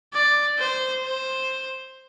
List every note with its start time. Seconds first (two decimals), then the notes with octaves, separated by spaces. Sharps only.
0.13 D5
0.59 C5
1.03 C5